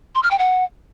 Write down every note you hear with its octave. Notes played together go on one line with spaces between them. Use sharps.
C6
F6
G5
F#5